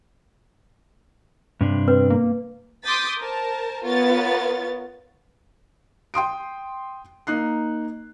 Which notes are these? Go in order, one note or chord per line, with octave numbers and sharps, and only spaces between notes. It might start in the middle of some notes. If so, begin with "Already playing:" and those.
G2 C3 D4
C4 B4
A#3
C6 D6 D#6 G6 A6 B6
A#4 C5 A5
B3 F4 A#4 C#5 A6
G5 C6 D#6 D7
A#3 D#4 F#6 C7